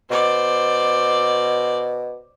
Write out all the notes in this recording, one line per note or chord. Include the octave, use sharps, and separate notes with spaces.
B2 C5 D5